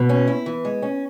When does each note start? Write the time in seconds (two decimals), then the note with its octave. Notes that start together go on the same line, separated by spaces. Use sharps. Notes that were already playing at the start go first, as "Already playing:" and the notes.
Already playing: B2
0.09 C#4
0.27 E4
0.46 E3
0.65 G#3
0.82 C#4